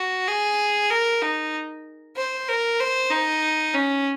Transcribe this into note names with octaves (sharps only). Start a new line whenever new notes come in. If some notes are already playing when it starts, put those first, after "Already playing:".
Already playing: F#4
G#4
A#4
D#4
C5
A#4
C5
D#4
C#4